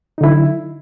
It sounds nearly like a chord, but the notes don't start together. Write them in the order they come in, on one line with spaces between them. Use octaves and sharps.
D#4 D3 E4 F#3